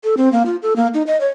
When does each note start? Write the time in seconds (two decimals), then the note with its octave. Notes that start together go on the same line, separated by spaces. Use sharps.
0.04 A4
0.17 C4
0.32 A#3
0.46 F4
0.62 A4
0.76 A#3
0.94 D#4
1.07 D#5
1.21 C#5